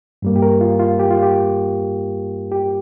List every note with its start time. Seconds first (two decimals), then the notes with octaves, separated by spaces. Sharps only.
0.22 G2 G3 A#3
0.36 G4
0.42 A#4
0.61 F4
0.79 F4
1.00 G4
1.11 F4
1.23 G4
2.52 G4